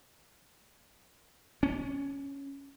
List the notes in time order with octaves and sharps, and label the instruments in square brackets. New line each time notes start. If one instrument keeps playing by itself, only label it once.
[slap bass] C#4